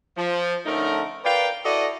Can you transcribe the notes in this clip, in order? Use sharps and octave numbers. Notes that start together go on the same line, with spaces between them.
F3
D3 A3 C#4 D#4 A#4
A#4 B4 D5 F5 G5
E4 F#4 A4 D5 D#5